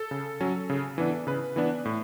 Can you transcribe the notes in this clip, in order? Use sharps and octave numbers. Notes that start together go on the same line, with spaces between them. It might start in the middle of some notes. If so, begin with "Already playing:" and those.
Already playing: A4
C#3
F#3 C#4
C#3
E3 B3 D4
C#3 B4
E3 B3 D4
A2